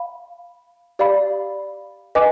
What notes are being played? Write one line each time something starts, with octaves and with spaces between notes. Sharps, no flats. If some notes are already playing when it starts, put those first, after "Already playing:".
Already playing: F5 B5
G4 D5 F5 B5
B4 D#5 G#5 D6